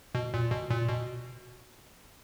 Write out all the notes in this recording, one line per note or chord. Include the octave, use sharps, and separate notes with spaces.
B2
A#2
B2
A#2
B2